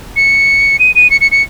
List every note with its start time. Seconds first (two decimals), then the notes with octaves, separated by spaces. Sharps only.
0.16 C#7
0.79 D#7
0.95 D#7
1.10 C#7
1.21 C#7
1.31 C#7